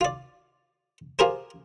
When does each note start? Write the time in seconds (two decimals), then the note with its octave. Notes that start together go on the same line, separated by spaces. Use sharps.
0.01 F4 D5
1.19 F4 G4 G#4 A#4 C5